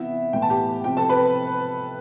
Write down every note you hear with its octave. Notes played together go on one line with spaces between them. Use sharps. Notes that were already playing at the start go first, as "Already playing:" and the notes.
Already playing: C3 E3 B3 E4 E5
A2 E3 B3 G5
A5
G4 G5
C3 F3 C4 G4 G5
A4 A5
B4 B5